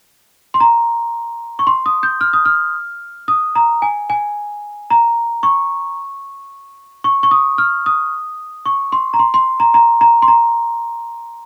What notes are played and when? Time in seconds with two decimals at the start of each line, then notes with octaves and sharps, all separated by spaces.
0.54 C6
0.60 A#5
1.59 C#6
1.67 C6
1.86 D#6
2.03 G6
2.21 F6
2.33 D#6
2.46 F6
3.28 D#6
3.55 A#5
3.82 G#5
4.10 G#5
4.90 A#5
5.43 C#6
7.04 C#6
7.23 C#6
7.31 D#6
7.58 F6
7.86 D#6
8.66 C#6
8.92 C6
9.14 A#5
9.19 C6
9.34 C6
9.60 A#5
9.74 A#5
10.01 A#5
10.22 C6
10.28 A#5